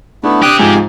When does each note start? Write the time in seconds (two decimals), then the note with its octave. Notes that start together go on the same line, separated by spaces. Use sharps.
0.24 A3 B3 D4 E4
0.42 C4 G4 D6 D#6 F#6
0.59 G#2 F3 G#5